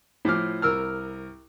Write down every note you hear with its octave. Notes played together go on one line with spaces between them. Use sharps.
A2 F3 D6 F6
C2 A#4 E6 F6